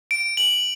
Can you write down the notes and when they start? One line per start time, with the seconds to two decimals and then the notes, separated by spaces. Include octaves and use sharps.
0.11 D7
0.37 F#7